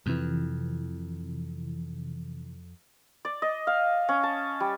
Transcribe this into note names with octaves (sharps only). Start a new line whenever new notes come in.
F2 C3 E3
D5
D#5
F5
C#4
A5
G3